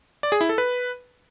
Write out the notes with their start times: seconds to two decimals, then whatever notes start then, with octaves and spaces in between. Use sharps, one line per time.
0.23 D5
0.32 G#4
0.41 E4
0.49 A4
0.58 B4